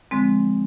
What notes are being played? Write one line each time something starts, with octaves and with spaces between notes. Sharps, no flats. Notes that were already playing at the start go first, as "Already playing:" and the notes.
D3 F3 G#3 C4